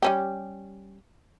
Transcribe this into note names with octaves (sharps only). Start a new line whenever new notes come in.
G3 C#4 G4